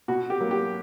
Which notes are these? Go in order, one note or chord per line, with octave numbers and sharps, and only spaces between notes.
B2 F#4
G4
F#3 A#3
G4